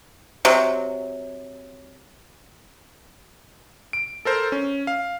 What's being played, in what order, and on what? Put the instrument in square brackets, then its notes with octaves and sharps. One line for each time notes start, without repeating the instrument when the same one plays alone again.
[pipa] C3 F#3
[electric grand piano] D7
A4 A#4 C5
C#4
F5